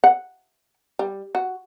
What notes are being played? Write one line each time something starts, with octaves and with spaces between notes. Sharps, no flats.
F#5
G3
F#4